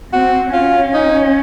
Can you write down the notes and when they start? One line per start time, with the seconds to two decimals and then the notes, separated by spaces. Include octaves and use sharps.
0.13 C4 F#4
0.53 C#4 F4
0.94 D#4